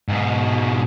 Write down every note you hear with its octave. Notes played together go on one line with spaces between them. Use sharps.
G#2 B2